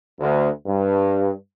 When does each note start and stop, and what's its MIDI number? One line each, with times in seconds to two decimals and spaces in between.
0.20 0.49 38
0.66 1.31 43